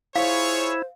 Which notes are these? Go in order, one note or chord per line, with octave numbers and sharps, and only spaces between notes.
E4 F4 G#4 C5 C#5 F5